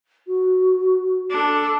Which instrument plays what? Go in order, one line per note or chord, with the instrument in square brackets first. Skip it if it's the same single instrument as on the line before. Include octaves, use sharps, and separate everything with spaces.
[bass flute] F#4
[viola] D4 A4